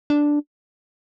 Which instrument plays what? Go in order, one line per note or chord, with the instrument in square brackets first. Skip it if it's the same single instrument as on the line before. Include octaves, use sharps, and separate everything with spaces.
[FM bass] D4